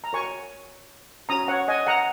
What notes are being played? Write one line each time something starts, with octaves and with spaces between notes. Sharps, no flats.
A#5
F#4 A#4 C#5 G#5 C#6
C#4 F#4 C#5 A#5 D#6
C#5 F#5
D#5 G#5
F#5 A#5